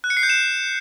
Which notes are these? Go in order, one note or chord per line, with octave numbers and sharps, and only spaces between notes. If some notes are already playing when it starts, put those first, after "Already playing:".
F#6
C#7
C7
G6
E7